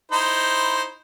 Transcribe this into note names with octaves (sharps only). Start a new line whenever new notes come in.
D#4 E4 C5